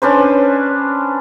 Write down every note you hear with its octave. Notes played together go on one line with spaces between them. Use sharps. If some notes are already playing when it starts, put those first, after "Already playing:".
C#4 D4 B4 C5